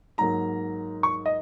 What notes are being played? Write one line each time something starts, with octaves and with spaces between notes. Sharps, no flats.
G#2 F#3 A#3 A#5
C#6
D#5